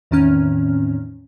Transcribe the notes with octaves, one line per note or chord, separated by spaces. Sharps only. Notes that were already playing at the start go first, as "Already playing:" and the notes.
E2 A2 D#3 C4 C#4 F6